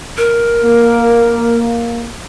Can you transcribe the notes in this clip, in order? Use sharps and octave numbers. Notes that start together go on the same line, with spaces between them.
A#4
A#3